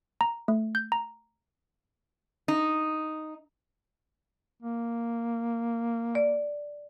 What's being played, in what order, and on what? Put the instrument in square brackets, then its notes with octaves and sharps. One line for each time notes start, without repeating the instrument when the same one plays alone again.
[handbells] A#5
A3
G6
A#5
[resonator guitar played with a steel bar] D#4
[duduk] A#3
[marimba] D5